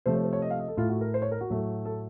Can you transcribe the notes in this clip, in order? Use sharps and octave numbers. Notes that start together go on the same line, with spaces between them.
C3 F3 A3 C5
C#5
C5
C#5
D#5
F5
D#5
A4
A2 A3 F4
F#4
A#4
C5
C#5
A#4
F#4
A2 F#3 A3
A4